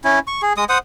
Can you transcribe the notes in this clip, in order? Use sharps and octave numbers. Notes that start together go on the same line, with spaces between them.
C#4 E4
C#6
G#4
G#3 D#6
C5 F#5 D#6